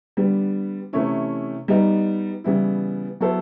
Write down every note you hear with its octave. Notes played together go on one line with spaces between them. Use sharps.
D3 G3 B3
C3 E3 A3 C#4 E4
G3 B3 D#4
C#3 E3 G3 B3 E4
F#3 B3 E4 A4 C5